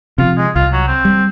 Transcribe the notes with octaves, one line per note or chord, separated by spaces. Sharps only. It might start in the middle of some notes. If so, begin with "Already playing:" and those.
C3 F3 F4
G#3
C2 F4
F#3
C4
G3